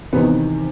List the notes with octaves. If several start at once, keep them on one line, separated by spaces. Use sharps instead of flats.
E2 C3 D#3 B3